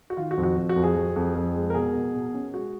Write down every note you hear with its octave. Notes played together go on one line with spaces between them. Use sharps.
F#4
D#3 F4
F#4
F2
F#4
F2
F#4
F2
G#4
F2
F2
F2
G#3
A#4
B2 G#4
B2
B2
C#4
G#3 F#4